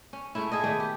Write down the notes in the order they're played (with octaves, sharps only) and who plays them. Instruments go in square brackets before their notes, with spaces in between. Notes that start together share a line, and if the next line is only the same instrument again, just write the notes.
[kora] C#4
G#2 A3 C#4 E4
E4 G#4 A4 D#5
D#3 A3 B3 D5
G4